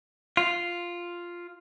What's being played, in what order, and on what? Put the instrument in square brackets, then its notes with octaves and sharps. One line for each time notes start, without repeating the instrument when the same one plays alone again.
[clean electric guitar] F4